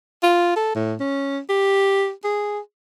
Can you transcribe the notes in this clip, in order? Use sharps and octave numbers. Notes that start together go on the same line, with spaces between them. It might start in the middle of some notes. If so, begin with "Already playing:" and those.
F4
A4
A2
C#4
G4
G#4